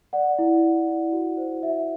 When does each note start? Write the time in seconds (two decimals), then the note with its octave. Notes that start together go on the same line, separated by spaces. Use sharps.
0.13 D5 F#5
0.39 E4
0.63 E4
0.87 E4
1.12 F#4
1.37 C5
1.62 F#4 E5